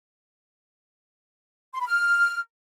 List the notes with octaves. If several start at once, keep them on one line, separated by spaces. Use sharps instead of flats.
C6
B5
F6